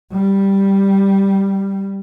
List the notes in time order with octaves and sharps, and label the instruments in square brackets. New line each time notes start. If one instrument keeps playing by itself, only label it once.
[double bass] G3